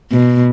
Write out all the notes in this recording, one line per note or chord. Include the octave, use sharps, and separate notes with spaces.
B2